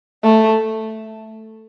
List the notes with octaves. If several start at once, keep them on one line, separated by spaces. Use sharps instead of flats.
A3